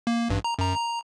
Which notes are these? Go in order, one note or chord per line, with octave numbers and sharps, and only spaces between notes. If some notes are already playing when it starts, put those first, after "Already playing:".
A#3
A1 G2
A#5
F#2 A#5
A#5